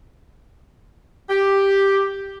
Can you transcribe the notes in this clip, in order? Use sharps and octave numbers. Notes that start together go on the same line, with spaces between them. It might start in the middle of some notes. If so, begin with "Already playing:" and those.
G4